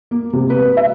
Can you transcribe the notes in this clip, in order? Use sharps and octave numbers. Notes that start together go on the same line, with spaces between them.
A#3
C3
B4
E5